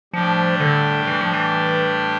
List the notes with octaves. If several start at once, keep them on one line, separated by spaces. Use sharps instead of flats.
A2 F3 G3 D4 G4
D3
E3
F3
E3